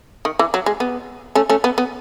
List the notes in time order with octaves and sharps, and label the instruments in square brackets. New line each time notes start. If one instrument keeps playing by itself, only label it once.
[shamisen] D#3
E3
F#3
G#3
B3
A3 C#4
A3 C#4
B3
B3